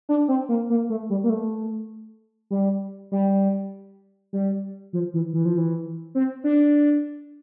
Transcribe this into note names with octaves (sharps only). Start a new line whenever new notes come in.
D4
C4
A#3
A#3
A3
G3
A#3
A3
G3
G3
G3
F3
E3
E3
F3
E3
C4
D4